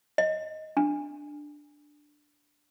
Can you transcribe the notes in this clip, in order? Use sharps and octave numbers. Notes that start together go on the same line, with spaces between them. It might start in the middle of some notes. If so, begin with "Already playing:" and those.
D#5
D4